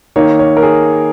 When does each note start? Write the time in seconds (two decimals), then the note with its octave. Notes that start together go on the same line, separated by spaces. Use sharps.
0.16 D#3 A#3 D#4 C#5
0.39 C#5
0.57 A#4
0.63 G#4